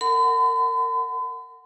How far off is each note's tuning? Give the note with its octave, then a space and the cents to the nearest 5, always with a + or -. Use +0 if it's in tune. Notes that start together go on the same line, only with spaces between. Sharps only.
A#4 -30 F#5 +0 B5 +45